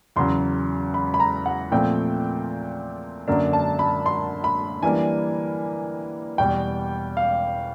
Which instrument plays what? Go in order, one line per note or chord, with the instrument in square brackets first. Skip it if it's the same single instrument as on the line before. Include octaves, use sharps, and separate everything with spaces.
[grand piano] E2 C#3 F#3 [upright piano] C6
[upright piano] B5
B5
A#5
F#5
[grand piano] A#2 F3 A3 C4 [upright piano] G5
[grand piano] F#2 D3 F#3 A#3 D4
[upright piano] A5
B5
C6
B5
[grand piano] E3 G3 A#3 D4 [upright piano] G#5
[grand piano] E2 B2 G3 [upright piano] G5
[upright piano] F5